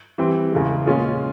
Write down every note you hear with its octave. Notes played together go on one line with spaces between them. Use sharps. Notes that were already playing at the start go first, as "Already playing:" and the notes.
E3 G3 C4
E2 C#3 E3 G#3
A#2 G#3 C#4 F4 G#4